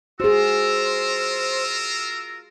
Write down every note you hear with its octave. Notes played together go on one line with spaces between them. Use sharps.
F4 F#4 G#4 A#4 C5 E6